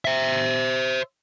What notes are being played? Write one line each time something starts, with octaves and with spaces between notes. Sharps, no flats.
C5 E5